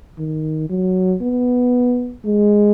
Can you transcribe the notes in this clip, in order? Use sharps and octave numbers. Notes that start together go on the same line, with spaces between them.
D#3
F#3
B3
G#3